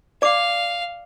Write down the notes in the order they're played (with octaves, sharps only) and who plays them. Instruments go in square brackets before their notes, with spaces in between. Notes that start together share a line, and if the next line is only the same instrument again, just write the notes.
[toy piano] D5 D6 [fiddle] F5